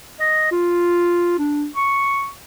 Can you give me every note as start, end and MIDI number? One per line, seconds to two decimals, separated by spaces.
0.20 0.47 75
0.51 1.37 65
1.38 1.66 62
1.76 2.29 85